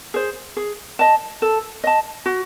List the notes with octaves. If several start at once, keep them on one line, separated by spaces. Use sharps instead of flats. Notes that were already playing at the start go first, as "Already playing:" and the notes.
G#4 C5
G#4
D#5 A5
A4
D#5 A5
F#4